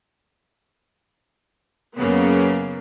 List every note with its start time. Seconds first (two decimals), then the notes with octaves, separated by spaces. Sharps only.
1.97 F#2 C#3 A#3 B3